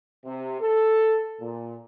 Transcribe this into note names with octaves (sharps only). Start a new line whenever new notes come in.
C3
A4
A#2